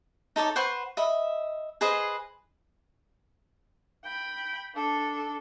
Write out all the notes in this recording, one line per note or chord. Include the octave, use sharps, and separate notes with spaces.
D#4 A4 C#5 D5
B4 C5 F#5 C#6
D#5 E5 B5
G#4 B4 C5 D#5
G5 B5
D4 A4